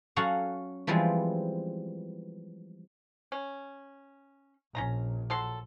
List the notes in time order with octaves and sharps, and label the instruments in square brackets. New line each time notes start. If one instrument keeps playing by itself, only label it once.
[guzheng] F#3 C#4 F#4 A4 F5 F#5
E3 F3 G3 G#3 B3 C4
[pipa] C#4
[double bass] A#1 [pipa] C#4 F4 A#5
[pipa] F#3 A4 C6